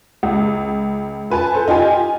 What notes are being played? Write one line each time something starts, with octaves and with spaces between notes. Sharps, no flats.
C#2
F4 B4 G#5 A5
A4 C5
D#4 F4 G4 G#5